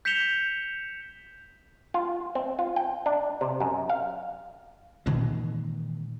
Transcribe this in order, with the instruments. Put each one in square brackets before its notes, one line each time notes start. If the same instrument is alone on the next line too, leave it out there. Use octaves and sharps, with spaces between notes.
[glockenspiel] G6 B6 C#7 E7 F7 G7
[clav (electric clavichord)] F4
C4
F4
G5
D4
C3
F#2
F5
[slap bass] A#2 D#3 E3 G#3